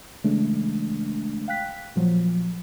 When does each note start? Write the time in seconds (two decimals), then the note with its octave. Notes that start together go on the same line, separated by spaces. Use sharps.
0.24 C#3 E3 G#3 A3 D4
1.48 F5 G5 F#6 B6
1.96 A#2 F3 F#3